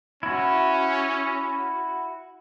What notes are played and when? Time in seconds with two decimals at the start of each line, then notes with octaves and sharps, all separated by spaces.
0.23 C#4 E4 F#4